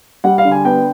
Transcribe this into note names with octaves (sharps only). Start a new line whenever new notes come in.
G3 F#5
F5
D3
G#5
B3 G5